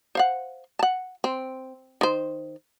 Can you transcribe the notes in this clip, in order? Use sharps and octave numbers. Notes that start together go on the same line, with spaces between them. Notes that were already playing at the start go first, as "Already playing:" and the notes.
C5 F5 F#5
F#5 A5
C4
D#3 C5